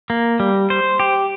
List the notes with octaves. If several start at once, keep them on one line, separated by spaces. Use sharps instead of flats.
A#3
G3
C5
G4